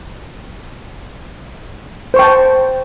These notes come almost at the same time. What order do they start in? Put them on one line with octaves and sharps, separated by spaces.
C5 C#6 G5 A5